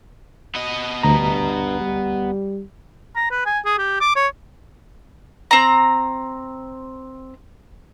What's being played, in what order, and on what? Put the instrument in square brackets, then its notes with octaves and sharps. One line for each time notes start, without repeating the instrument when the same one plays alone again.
[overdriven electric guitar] B3 D#5
[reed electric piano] D2 A#5 [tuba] G2
[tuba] G3
[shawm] A#5
B4
G#5
G#4
G4
D6
C#5
[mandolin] C4 A#5